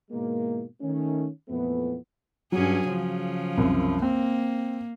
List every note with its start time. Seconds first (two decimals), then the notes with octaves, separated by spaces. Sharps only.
0.11 G#2 B2 E3 G#3 A#3
0.81 D#3 A3 C#4
1.49 F2 A#2 E3 A3 B3
2.52 G2 F#3 C#4 G#4
2.88 C#3 F3
3.57 C2 F#2
4.02 A#3 C4